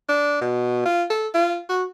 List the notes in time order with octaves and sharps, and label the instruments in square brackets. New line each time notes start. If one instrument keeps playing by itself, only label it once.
[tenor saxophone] D4
B2
F4
A4
F4
F#4